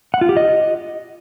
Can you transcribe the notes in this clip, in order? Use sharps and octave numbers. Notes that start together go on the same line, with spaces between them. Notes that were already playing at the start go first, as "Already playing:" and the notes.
F#5
F4
G4
D#5